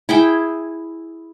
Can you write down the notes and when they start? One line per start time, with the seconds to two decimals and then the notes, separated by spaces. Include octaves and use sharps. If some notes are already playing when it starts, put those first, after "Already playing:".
0.09 E4 G#4 G5